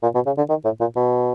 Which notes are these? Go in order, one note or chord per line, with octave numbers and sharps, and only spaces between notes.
A#2
B2
C#3
D3
D#3
A2
A#2
B2